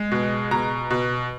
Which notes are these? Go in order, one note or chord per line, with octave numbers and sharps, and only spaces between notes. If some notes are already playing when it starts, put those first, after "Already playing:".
Already playing: G#3
B2
B2 A#5
B2